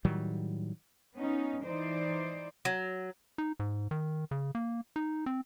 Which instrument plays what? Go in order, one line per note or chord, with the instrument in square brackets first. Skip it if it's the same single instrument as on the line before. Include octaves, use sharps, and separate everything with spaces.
[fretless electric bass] A2 D#3 F#3 G3
[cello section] B3 C#4 D#4
E3 D#4 C5 D5
[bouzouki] F#3
[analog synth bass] D#4
G#2
D#3
C#3
A#3
D#4
C4